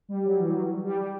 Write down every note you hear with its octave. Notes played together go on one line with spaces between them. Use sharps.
G3
F#3
E3
F#3
G3
G3